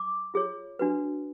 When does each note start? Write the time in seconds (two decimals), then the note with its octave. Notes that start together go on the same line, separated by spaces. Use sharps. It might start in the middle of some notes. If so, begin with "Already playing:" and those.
Already playing: D6
0.34 F4 G#4 C#5
0.79 D4 F#4 B4